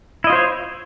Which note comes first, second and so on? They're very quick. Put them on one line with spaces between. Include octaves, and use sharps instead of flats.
E4 D#5 F4 C5 C#5